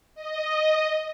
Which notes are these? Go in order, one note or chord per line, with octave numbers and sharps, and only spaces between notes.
D#5